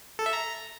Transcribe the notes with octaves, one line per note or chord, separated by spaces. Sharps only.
A4
E5
A#5